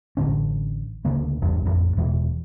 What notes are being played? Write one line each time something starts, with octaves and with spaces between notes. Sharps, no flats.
A1 A2 D3 C#4
D2 C#3 A#3
A1 E2 G2
A1 F2
E2 B2 E3 F3